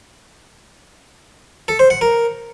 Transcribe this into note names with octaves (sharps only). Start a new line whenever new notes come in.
A4
C5
F#5
A#4